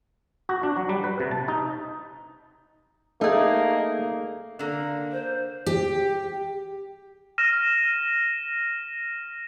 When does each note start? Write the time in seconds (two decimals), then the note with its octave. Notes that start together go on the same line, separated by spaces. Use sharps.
0.49 F#4
0.63 D4
0.77 F#3
0.89 G3
1.04 B4
1.20 C3
1.31 A5
1.48 D#4
3.21 A3 A#3 D#4 G#4
4.59 D3 A#3
5.12 C5
5.66 G4
7.38 F6 A#6 D#7 E7